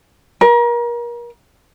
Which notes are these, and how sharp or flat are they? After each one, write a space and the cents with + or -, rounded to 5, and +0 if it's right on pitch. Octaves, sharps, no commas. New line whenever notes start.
A#4 +35